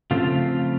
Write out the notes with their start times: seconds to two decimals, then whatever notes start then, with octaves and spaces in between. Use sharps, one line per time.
0.11 C#3 F3 A3 C4 F4